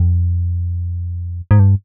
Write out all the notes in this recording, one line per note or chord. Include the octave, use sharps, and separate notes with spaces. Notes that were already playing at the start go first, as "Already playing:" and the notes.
Already playing: F2
G#2
G2